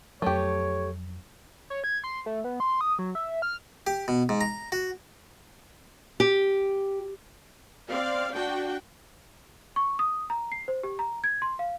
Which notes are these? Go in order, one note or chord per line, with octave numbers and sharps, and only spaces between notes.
F2 F#3 A3 G4 C#5
C#5
G#6
C6
A3
B3
C6
D#6
F#3
E5
F6
G4
B2
G#2
A#5
F#4
G4
C4 D5 F5
D4 F#4 G5
C#6
D#6
A#5
C7
C5
G4
A#5
G#6
C6
F5